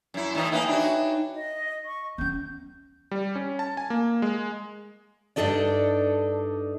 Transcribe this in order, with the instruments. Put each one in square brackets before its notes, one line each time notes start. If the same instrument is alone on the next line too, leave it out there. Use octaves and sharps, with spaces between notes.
[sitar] F#2 E4
A2 E3 D#4
[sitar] A#3 B3 D#4 [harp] E5 G5 G#5
[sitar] D4 F#4 [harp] D#4 C#5 B5
[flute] D#5
C#6
[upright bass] B3 C#4 [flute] G6
[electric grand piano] G3
C#4
A5
G#5
A#3
G#3
[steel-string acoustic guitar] G2 A#2 D4 D#4 A4 D5